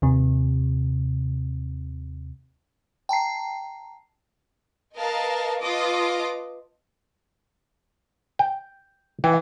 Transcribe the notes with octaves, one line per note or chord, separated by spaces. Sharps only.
D#2 C3
G5 A5 A#5 C7
A#4 B4 D#5 F5 A5
F4 B4 D#5 A5 D6 D#6
G5
E3 G5